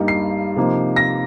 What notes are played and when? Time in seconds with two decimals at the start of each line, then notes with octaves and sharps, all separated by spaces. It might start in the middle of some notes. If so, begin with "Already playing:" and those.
Already playing: G2 G3 A#3 D#4
0.08 C7
0.56 C3 F3 A#3 D#4
0.96 A#6